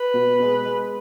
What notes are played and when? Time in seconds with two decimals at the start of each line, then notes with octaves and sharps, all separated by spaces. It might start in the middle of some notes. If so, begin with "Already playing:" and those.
Already playing: B4
0.14 B2
0.40 G#3 B3
0.65 G#3